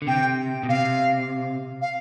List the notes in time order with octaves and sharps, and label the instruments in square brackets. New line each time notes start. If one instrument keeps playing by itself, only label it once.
[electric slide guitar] D3
[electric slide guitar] C3 [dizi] G5
[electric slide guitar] B2
[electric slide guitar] C3 [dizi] F5
[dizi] F5